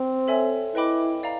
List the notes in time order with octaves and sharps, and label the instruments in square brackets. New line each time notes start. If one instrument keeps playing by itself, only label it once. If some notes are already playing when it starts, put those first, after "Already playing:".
Already playing: [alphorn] C4
[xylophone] A4 C#5 E5 G#5
[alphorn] E4 [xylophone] B4 D#5 G5 B5 D6
[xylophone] D5 F5 A#5